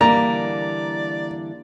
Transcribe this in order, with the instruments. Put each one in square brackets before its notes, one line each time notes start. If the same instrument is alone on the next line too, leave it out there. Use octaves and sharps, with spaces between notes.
[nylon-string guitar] D3 E3 G3 [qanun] A#3 [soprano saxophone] D5 [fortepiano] A#5